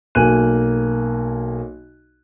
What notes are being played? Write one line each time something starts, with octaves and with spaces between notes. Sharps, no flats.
B1 A#3 G#5 F#6 D#7